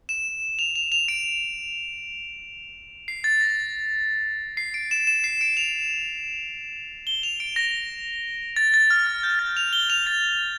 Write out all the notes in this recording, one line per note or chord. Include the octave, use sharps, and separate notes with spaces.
E7
F7
F7
F7
D7
C7
A6
A#6
C7
D7
E7
E7
C7
D7
F7
G7
F7
D7
A#6
A6
A6
F6
F6
G6
A6
F7
G7
F7
A6